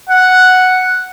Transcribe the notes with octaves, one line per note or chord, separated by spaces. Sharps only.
F#5